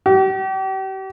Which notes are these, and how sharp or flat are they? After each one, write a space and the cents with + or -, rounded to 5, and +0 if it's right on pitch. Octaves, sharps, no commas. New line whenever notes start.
G4 -35